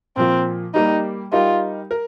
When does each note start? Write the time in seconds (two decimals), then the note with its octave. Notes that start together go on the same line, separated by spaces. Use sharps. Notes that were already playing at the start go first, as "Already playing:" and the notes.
0.17 A#2 F3 A#3 C4 F4
0.74 G3 A#3 D#4 G4
1.32 G3 D#4 F4 G4 A#4
1.91 A#4